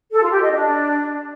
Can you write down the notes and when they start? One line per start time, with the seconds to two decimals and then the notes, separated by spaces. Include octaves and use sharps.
0.12 A4
0.22 F4
0.31 G4
0.41 D#5
0.51 D4